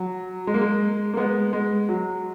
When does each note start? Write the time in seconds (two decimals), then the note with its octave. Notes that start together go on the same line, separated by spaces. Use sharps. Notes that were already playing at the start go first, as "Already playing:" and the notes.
Already playing: F#3
0.47 G#3
0.54 A#3
0.61 G#3
1.13 A#3
1.17 G#3 B3
1.53 G#3
1.89 F#3